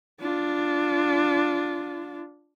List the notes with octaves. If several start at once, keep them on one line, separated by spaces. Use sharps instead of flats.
D4 F4